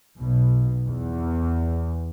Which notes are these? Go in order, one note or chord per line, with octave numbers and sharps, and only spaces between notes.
B1 B2
E2